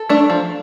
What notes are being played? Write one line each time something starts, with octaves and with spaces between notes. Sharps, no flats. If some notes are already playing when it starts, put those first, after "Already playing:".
Already playing: A4
A3 D4
F3